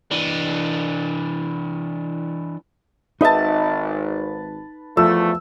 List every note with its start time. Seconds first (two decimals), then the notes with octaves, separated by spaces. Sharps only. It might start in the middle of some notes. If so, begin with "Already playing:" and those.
0.11 E3 D4
3.21 G#1 D#4 B4 D#5 E5 A5
4.97 E2 F3 A3 E6